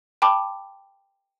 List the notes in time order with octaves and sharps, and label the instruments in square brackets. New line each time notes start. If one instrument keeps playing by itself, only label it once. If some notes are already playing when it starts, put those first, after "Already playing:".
[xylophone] G5 A5 B5 D6